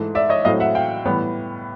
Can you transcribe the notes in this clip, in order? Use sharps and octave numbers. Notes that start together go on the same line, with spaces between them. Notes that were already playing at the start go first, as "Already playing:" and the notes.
Already playing: G#2 E3 A3
D5 E5
C#5 D#5
A2 F#3 A3 C4 D#5 F5
E5 F#5
F5 G5
A2 E3 G3 B3